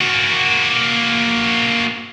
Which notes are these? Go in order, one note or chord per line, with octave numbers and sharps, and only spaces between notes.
A#3 F#4